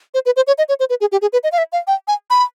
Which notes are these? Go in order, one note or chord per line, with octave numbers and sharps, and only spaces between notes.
C5
B4
C5
C#5
D#5
C#5
C5
B4
G#4
G4
G#4
B4
D#5
F5
E5
F5
G5
G#5
B5